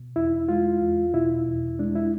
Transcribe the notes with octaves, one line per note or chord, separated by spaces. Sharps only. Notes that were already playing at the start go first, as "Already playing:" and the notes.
Already playing: B2
E2 E4
G#3 F4
E2
B2 E4
E2
G#3 D4
E4